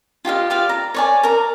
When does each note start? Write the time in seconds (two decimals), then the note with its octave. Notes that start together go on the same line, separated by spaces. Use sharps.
0.25 F4 G4 D#5 F5
0.50 G4 D5 F5
0.69 A#5
0.94 C#5 D5 G#5
1.23 A#4 A#5